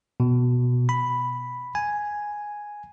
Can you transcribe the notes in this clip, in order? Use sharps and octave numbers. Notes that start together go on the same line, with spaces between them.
B2
B5
G#5